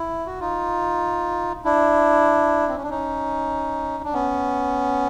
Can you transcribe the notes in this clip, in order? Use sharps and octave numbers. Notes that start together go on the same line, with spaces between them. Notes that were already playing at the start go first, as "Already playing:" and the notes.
Already playing: E4
F#4
D#4 F4
D4 E4
C4
C#4
D4
C#4 D#4
D4
B3 C#4